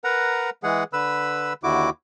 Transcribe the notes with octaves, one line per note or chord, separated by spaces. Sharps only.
A#4 B4 F#5 A#5
E3 G#3 G#4 F#5
D3 B4 B5 E6
D#2 D3 E4 F#4 D6